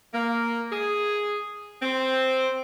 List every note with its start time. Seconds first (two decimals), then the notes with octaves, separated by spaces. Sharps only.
0.14 A#3
0.72 G#4
1.82 C4